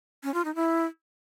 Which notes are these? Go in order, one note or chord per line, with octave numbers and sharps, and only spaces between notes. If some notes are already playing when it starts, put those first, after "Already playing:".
C#4
F4
D#4
E4